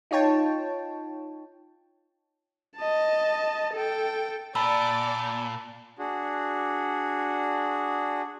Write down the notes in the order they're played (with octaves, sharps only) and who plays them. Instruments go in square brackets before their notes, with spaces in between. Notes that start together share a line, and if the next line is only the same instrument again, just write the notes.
[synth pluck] D#4 F4 C#5 G5 A5
[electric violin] D#5 A5
A4 G5
[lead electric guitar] A#2 [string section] D5 [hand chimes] A5 B5 E6
[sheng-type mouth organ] D4 F#4 G#4